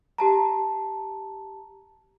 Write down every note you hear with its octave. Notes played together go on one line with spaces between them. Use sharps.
G4 A5 A#5